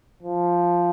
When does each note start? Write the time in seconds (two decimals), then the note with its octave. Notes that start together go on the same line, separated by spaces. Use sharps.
0.23 F3